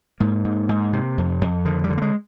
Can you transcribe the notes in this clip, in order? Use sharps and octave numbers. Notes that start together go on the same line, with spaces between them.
G#2 A#3
G#2
G#2
C3
F2
F2
D3 D#3
G3
D3
A#3
G#3